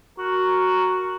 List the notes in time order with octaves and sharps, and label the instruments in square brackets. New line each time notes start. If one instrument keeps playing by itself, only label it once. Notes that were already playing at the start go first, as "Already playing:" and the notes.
[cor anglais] F#4 [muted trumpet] A#4